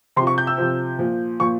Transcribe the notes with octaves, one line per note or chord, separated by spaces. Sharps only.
C3 F3 C6
C#6
G6
E6
C3 F3
A#2 F3
A#2 F3 C#6